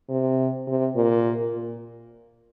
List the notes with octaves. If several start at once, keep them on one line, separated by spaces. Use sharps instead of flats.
C3
C3
A#2
A#2